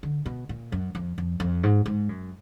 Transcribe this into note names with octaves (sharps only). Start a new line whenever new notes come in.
D3
B2
A#2
F#2
F2
F2
F2
G#2
G#2
F#2